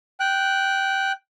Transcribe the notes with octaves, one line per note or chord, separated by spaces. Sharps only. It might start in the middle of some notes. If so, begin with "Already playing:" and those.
G5 F#6